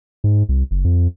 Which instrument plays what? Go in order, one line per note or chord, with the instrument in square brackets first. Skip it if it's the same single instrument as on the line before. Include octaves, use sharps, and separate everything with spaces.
[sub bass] G#2
C2
F#1
F2